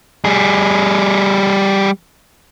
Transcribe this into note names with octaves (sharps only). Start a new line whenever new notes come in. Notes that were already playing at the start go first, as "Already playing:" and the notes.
G3 G#4